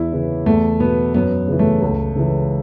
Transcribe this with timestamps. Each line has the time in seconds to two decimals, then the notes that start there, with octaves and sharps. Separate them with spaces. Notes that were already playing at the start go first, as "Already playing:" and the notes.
Already playing: E2 E4
0.12 C#3 E3
0.46 E2 A3
0.80 B2 B3
1.14 F#2 B3
1.48 C#3 E3
1.59 A3
1.82 C#2
2.16 C#3 E3